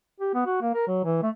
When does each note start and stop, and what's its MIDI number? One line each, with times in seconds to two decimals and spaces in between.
0.20 0.32 67
0.34 0.42 59
0.46 0.59 66
0.62 0.72 58
0.74 0.85 70
0.87 1.01 54
1.04 1.20 52
1.22 1.30 57